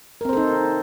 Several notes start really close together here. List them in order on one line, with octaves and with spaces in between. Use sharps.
A#4 C4 C5 A4 D#4